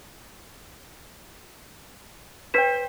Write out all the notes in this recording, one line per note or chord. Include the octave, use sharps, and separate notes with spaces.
B4 C5 G5 B6 E7